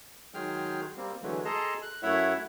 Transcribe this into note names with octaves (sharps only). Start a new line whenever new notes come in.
D#3 F#3 G#3 G#4 G5 F6
G3 A#3 C4
D3 E3 F#3 G#3 A3
G#4 A4 D#5 A5 A#5 C6
F#6
F#2 A3 E4 C#5 E5 F#5